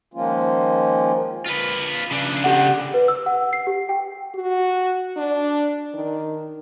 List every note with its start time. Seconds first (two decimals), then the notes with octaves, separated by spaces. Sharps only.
0.14 D#3 F3 G#3 A#3 C#4 F4
1.46 F4 B4
2.11 C#3 D4
2.44 G4 F#5
2.94 B4
3.08 E6
3.26 F#5
3.53 C7
3.67 G4
3.89 G5
4.35 F#4
5.17 D4
5.94 D#3